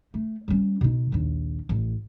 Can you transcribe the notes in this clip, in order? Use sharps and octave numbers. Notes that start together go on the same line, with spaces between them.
A3
G3 C#4
B2 D#4
A#1 D#2
A1